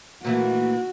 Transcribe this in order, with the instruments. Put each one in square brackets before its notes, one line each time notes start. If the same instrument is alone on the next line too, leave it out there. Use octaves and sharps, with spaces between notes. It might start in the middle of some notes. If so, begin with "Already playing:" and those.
[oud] A#2 E3 A3 [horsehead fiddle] F#4